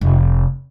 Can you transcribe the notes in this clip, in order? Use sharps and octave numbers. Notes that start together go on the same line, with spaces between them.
F1